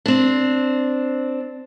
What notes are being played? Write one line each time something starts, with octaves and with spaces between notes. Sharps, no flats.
C4 D4